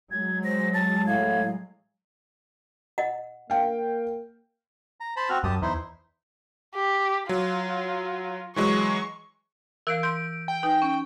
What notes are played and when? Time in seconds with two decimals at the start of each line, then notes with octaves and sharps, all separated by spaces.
0.11 F#3 G#3 G#6
0.44 C5 A#6
0.74 A5 A6
1.07 A2 F5 G#6
2.98 D#5 F#5
3.50 A#3 F5 G5
5.00 A#5
5.16 C5 A5 B5
5.29 C4 F#4 F6
5.44 F#2 G4 A5 D#6
5.62 E2 D#4 E4 C5
6.75 G4
7.29 F#3 F4
8.56 E3 F#3 G#3 C#6
9.87 E3 A#4 F5 E6 D7
10.03 C6 G6 D7
10.48 G5
10.63 D#4 B4 G#5
10.82 C#4